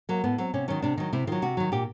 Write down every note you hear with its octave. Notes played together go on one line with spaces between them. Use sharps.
F#3 A#3
A2 B3
F#3 C4
C3 C#4
D#3 F#3 C#4
C3 D4
D#3 F#3 D#4
C3 E4
D#3 F#3 F4
C3 F#4
D#3 F#3
A#2 G4